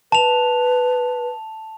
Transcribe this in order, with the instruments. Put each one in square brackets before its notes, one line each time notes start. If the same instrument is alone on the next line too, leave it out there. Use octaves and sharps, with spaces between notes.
[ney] B4 [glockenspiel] A5 F7